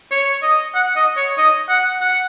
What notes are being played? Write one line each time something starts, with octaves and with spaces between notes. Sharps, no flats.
C#5
D#5
F#5
D#5
C#5
D#5
F#5
F#5